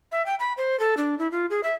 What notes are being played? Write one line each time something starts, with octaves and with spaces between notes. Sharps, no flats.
E5
G5
B5
C5
A4
D4
E4
F4
G#4
E5